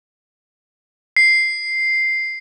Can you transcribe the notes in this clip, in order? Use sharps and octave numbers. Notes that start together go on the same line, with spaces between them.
C7